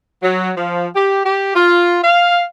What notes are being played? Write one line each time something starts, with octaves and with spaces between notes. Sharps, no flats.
F#3
F3
G4
G4
F4
F5